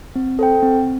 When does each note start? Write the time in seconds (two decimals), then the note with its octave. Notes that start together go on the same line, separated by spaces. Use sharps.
0.16 C4
0.39 A4 C5 G5
0.62 C4